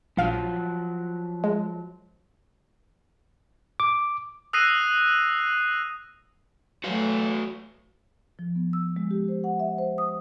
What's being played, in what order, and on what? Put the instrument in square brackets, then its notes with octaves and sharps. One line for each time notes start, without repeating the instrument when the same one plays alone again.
[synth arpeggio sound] A#1 F5 F6 [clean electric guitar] F3 F#3
[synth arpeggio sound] G#3
[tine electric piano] D6
[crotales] D#6 E6 F#6 A#6 C7 D#7
[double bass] F#3 A3 [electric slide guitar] F#4 B4 F5
[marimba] F3
B3
E6
G#3
G4
C5
F#5
E5
C5
D#6